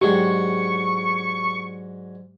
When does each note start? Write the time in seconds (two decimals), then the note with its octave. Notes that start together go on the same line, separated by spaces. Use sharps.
0.01 G#2 F#3 G#3 D4 G4 C#6